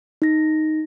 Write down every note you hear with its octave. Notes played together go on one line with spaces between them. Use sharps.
D#4 A#6